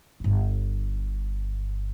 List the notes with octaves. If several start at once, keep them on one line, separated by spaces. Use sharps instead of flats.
D1 G1